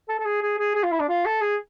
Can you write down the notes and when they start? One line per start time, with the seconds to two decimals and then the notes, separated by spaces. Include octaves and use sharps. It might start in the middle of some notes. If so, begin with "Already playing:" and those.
0.09 A4
0.19 A4
0.26 G#4
0.42 G#4
0.59 G#4
0.75 G#4
0.84 F4
0.92 E4
1.00 D4
1.09 F4
1.26 A4
1.42 G#4